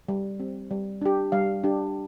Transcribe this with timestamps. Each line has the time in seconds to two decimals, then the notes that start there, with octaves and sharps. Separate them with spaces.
0.09 G3
0.40 C4 G4
0.71 G3
1.02 D4 G4
1.32 G3 F5
1.64 D4 G4